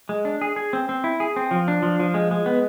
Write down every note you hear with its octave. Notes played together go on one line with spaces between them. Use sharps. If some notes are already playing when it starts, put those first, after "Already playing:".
G#3
D4
G#4
G#4
C4
C4
E4
G#4
C4
F3
D4
F3
F3
G#3
G#3
B3